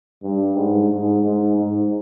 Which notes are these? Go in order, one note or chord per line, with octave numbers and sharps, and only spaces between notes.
G2
G#2
G#2
G#2
G#2